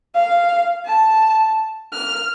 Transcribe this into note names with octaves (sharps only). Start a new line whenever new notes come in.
F5
A5
F6